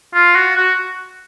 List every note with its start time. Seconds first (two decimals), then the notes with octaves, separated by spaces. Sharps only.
0.14 F4
0.35 F#4
0.57 F#4